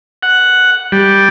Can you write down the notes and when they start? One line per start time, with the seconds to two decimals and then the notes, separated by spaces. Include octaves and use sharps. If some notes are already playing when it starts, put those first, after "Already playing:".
0.23 F#5
0.92 G3